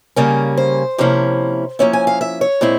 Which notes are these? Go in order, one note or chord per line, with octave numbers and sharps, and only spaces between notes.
C#3 G3 A#3 C#4
C5
C3 F3 A#3 C#4 E4
F3 A#3 C#4 E4 C#5
G#5
F5
E5
C#5
A#2 G#3 C4 E4